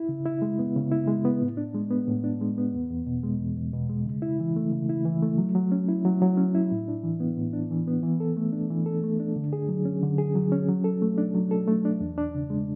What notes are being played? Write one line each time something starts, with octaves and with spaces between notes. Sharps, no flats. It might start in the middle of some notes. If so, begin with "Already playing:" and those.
Already playing: E4
C#3
E4
G#3
B3
C#3
E4
G#3
B3
A2
D4
G#3
B3
A2
D4
G#3
B3
E2
E2
B2
G#3
E2
E2
B2
G#3
C#3
E4
E3
A3
C#3
E4
E3
A3
F#3
F#3
C#4
E4
F#3
F#3
C#4
E4
A2
D4
E3
B3
A2
D4
E3
B3
E3
A4
A3
D4
E3
A4
A3
D4
D3
G#4
F#3
C#4
D3
G#4
F#3
C#4
F#3
A4
A3
D4
F#3
A4
A3
D4
E2
D4
C#3
G#3